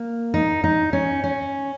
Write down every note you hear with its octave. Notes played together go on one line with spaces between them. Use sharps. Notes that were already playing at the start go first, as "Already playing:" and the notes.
Already playing: A#3
D#4
D#4
C#4
C#4